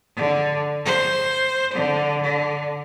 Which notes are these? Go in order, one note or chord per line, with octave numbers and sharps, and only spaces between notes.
D3
C5
D3
D3